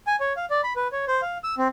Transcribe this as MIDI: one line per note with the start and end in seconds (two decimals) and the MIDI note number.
0.07 0.16 80
0.20 0.33 73
0.37 0.46 77
0.50 0.61 74
0.64 0.73 83
0.76 0.88 71
0.92 1.05 73
1.08 1.21 72
1.22 1.38 77
1.44 1.55 88
1.58 1.68 60